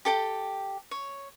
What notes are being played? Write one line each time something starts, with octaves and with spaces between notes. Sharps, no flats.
G4 A4 G5
C#5